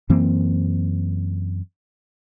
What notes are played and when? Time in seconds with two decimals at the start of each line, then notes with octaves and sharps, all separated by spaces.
0.10 F#2 E3 A#3 C4